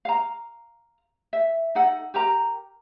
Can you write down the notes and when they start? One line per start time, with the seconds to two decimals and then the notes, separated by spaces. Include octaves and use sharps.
0.05 F5 A#5
1.33 E5
1.75 D#4 A4 F#5
2.14 G4 A#4 A#5